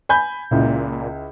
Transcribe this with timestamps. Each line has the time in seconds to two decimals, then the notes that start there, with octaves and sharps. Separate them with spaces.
0.09 G#5 B5 G6
0.51 C#2 A#2 E4